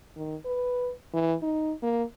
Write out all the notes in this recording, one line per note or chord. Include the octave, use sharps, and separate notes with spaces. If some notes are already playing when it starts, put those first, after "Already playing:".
D#3
B4
E3
D#4
A#3